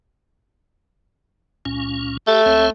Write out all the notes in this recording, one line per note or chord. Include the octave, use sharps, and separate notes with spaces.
C#2 A#2 C#4
A3 G4 A4
C#2 C4 C#5